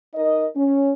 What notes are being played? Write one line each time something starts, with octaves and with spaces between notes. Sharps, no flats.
D#4 A#4 D#5
C#4